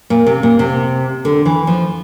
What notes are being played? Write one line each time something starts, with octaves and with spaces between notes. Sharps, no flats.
A#2
C3
A#2
C3
D3
E3
F3